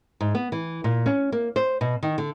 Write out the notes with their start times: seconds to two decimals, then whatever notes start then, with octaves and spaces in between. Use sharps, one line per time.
0.21 G#2
0.35 B3
0.52 E3
0.84 A#2
1.06 C#4
1.32 A#3
1.56 C5
1.81 B2
2.03 D#3
2.18 D3